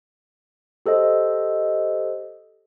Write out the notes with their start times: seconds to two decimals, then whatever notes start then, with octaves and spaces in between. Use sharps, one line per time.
0.86 G4 A4 C5 D#5